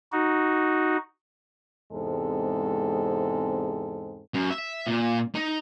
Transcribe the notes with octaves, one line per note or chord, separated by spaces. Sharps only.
D#4 F#4
E2 G#2 C3 G#3 C4 A4
F#2
E5
A#2
D#4